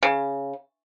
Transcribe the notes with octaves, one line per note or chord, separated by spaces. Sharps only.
C#3